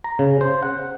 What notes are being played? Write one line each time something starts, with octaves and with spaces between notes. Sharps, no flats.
A#5
C#3
C5
F#5